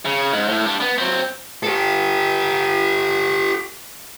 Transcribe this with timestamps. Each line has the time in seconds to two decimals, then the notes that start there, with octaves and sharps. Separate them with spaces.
0.05 C#3
0.33 G#2
0.48 A2
0.65 G3 D4
0.80 B3
0.98 F#3 C4
1.63 G4 A4